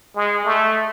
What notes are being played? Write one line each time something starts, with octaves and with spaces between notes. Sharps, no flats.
G#3
A3